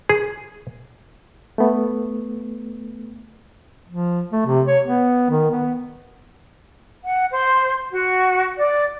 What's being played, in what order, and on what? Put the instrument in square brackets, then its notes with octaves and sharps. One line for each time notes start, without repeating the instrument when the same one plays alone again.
[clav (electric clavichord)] G#4
[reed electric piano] A3 B3
[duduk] F3
A3
C3
C#5
B3
D#3
B3
[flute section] F#5
C5
F#4
D5